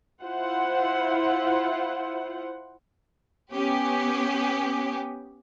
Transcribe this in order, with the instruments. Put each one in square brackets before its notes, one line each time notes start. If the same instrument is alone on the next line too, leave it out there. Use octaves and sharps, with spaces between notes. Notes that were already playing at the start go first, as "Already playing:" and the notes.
[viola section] E4 F4 C5 F#5
[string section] B3 C#4 G4